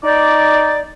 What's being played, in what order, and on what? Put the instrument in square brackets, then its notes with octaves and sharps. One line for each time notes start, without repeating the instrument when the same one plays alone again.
[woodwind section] D#4 D5